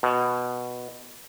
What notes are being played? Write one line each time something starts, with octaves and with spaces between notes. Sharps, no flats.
B2